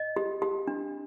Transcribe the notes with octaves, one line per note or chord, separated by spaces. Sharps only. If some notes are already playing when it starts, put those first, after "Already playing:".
Already playing: D#5
G4
G4
D4